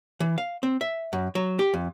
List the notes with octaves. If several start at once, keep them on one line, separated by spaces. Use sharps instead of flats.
E3
F5
C4
E5
F#2
F#3
G4
F2